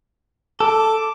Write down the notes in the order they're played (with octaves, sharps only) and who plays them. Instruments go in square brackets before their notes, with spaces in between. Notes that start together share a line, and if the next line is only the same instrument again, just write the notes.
[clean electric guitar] A4 [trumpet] D6